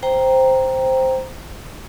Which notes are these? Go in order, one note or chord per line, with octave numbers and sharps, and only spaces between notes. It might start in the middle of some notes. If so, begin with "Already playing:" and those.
C5 G5 A#5